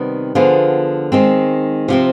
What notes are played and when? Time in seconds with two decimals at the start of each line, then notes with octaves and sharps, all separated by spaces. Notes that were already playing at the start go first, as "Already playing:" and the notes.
Already playing: C3 D#3 G3 B3
0.35 D3 F3 B3 F4 G#4
1.12 D#3 G#3 C4
1.88 C3 F3 C4